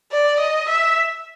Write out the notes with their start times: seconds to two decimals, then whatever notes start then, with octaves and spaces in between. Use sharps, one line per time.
0.12 D5
0.40 D#5
0.69 E5